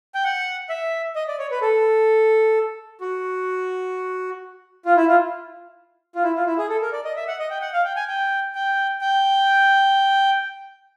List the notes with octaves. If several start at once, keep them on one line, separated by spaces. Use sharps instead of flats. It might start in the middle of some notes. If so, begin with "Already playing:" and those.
G5
F#5
E5
D#5
D5
C#5
B4
A4
F#4
F4
E4
F4
F4
E4
F4
E4
G#4
A4
A#4
D5
D#5
E5
F#5
D#5
G5
F#5
F5
G5
G#5
G5
G5
G5